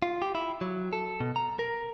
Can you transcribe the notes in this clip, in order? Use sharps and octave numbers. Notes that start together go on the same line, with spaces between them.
F4
G4
E4
F#3
A4
B2
A#5
A#4